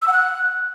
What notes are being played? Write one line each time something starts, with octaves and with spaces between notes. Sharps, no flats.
E6
F#5
F#6